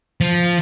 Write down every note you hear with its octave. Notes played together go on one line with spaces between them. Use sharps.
F3